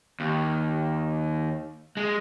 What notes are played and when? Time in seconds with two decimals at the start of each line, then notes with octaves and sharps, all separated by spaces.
0.20 D#2
1.97 G#3